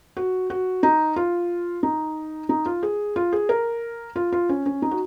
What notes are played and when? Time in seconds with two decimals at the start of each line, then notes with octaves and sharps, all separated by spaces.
0.17 F#4
0.50 F#4
0.83 D#4
1.16 F4
1.83 D#4
2.49 D#4
2.66 F4
2.83 G#4
3.16 F4
3.33 G#4
3.49 A#4
4.16 F4
4.32 F4
4.49 C#4
4.66 C#4
4.82 D#4
4.91 F#4